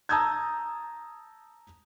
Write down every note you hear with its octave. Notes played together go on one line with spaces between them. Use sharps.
A5 A#5 D#6 E6 G6 G#6